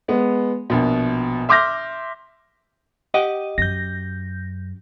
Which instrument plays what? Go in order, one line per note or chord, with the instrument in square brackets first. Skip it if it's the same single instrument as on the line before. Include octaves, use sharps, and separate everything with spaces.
[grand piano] G#3 B3
A#1 B2
E5 C6 D6 F6 G6 A#6
[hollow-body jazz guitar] G4 F#5 G5 [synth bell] D#5
[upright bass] F#2 [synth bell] G6 A#6